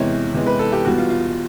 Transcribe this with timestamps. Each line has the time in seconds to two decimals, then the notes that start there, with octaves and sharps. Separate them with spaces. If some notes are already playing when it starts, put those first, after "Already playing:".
Already playing: E2 C3 E3 G#3 C#5
0.33 E2 C3 E3 G#3
0.47 B4
0.59 A4
0.72 G4
0.85 E2 B2 G3 F#4
0.98 F4
1.10 F4